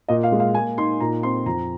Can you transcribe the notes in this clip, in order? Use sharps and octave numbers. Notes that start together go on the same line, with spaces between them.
A#2 D#5
F5
G#3
F5
A#3 G#5
D#4 C6
A#2 A#5
C4 C6
F2 A#5